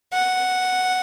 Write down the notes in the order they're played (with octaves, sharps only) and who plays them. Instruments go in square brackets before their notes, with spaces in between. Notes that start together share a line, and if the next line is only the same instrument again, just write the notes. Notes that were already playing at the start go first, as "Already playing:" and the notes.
[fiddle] F#5